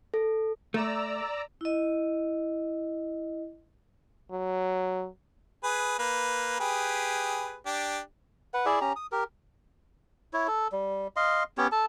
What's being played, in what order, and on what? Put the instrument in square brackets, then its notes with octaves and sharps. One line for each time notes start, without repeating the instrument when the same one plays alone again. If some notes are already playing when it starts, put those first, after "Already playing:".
[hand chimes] A4
[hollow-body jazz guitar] A3 [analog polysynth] D5 A#5 E6
[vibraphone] E4 D#5
[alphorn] F#3
[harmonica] G#4 B4
A#3 B4
G4 G#4 B4
D4 G4
[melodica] B4 F#5
E4 G#4 D5 E5
C#4 G4 A#5
D#6
G4 A#4
E4 C#5
A4
G3
D#5 F5 C6
B3 C#4 G4 C#5
A4 A5